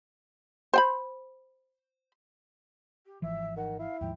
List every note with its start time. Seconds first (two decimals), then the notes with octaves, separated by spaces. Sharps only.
0.74 C5 G5 B5
3.06 G4
3.22 G#1 E3 F3 E5
3.57 D#3 F#5
3.79 E4 F5
4.01 D#2 G#2 F3 G5